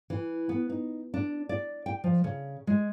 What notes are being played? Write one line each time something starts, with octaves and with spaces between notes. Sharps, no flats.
E3
B3
D#4
D4
D5
G5
F3
C#3
G#3